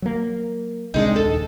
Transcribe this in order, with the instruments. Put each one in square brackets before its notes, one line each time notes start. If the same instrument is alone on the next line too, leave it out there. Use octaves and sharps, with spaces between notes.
[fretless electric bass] F#3 A#3
[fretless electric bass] C2 C3 D4 [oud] G#3 D#4
[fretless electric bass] D#1 [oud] A4